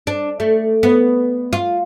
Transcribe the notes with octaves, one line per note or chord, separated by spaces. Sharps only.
D4
A3
B3
F4